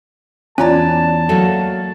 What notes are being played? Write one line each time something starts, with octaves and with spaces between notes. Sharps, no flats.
E2 C#4 E4 F4 C#5 D5 A5 A#5
F#3 A3 A#3 F#4 A4